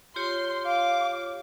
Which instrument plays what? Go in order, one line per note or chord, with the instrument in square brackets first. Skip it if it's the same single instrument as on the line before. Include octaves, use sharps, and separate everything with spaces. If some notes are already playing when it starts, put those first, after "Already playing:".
[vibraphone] F4 G4 C#5 [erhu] C6
[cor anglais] F5 [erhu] D6